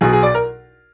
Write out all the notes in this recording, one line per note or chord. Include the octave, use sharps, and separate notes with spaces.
B1 B2 F#3 G#4
G#4
D5
A#4